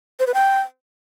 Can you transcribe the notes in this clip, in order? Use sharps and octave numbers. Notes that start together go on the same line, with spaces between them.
C5
B4
G5